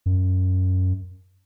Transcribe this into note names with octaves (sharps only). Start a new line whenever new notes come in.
F#2